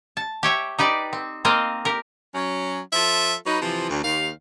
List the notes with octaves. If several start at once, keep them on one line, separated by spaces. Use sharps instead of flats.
A5
G4 C#5 E5 G5
D#4 G4 B4 D5
C4
A#3 C4 F4 C5 D#5 F5
G4 A#4
F#3 C#4
F3 F4 A4 E5
F#3 D#4 B4
C3 E3 F3
D2
D#2 F5